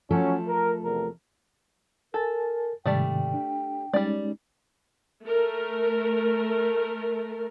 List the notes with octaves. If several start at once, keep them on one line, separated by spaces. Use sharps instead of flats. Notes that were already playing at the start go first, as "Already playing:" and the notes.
F3 F#3 A3 C#4 A4
A#4
E2 C3 A#4
A4 A#4 G#5 A5 A6
G#2 C3 D#3 G3 A3 D5 G5
D4
G3 G#3 C#4 D#4 D5
A3 A#4